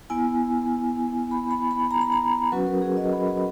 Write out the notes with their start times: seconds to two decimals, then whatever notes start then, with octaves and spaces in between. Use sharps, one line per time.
0.10 B3 E4 G#5
1.31 B5
1.51 B5
1.71 B5
1.91 A#5
2.01 B5
2.12 A#5
2.52 F#3 C#4 F#4 B4
2.66 A#4
2.82 G#4
2.97 D#5
3.13 B5